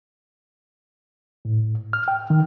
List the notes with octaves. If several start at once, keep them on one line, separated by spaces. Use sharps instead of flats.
A2
F6
G5
D#3